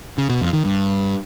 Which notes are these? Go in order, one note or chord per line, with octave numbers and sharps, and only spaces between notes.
C#3
B2
F2
D#3
G2